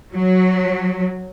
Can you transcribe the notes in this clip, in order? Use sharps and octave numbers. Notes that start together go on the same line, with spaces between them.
F#3